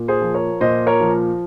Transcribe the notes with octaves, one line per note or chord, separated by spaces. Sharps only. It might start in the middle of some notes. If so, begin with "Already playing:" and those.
Already playing: A#2
G#4 C5
F3
A#4 C#5
A#2 C5 D#5
A#4 C#5
F3